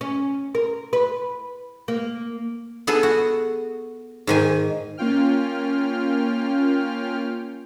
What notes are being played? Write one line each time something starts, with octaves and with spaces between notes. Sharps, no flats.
C#4
A#4
B4
A#3
B3 G#4 A4
F#4
G#2 D#3 G#5
A#3 C#4 F4 G5 F6